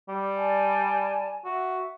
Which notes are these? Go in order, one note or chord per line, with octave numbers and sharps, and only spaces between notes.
G3
D5 G#5 A5
F#4 E5